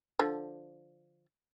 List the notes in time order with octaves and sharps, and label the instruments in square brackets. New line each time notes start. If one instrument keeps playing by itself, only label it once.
[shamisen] D3 F3